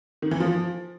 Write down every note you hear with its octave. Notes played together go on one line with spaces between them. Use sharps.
D#3
E3
F3